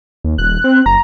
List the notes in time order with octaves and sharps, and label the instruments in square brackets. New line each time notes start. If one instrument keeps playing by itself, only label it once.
[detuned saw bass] D#2
[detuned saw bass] D#1 [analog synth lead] F#6
[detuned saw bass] C4
[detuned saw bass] F#1 [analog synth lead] A#5